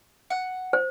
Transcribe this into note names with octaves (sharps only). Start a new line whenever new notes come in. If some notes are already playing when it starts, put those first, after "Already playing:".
F#5
C5